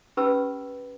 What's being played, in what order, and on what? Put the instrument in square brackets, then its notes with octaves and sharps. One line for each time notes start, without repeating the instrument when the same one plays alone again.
[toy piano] C#4 G4 B4 A5 B5 E6